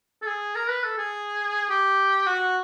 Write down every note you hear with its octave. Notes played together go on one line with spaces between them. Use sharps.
A4
G#4
A#4
B4
A4
G#4
G4
F#4